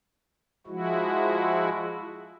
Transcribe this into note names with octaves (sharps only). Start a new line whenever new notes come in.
F3 G#3 E4 F#4